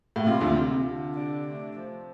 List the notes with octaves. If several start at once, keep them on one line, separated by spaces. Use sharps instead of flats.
A2
C3 F4
D2 D3
C3 F4
C3
D3
D4
A3
F3